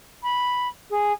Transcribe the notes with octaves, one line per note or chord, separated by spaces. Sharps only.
B5
G#4